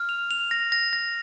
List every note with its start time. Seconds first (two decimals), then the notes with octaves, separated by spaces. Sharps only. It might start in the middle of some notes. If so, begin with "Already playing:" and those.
Already playing: F6
0.09 F7
0.31 F7
0.51 A#6
0.72 A#6
0.93 A#6